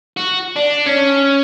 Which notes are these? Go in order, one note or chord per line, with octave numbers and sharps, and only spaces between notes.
F#4
D4
C#4